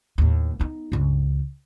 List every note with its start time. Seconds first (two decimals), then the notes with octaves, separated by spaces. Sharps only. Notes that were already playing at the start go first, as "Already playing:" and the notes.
0.18 D#2 A2
0.59 B3 D#4
0.92 C#2 G2